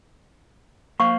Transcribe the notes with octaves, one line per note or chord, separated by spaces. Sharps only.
A#3 C5 F5 C#6